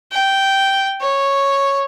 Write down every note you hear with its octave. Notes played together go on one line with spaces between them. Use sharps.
G5
C#5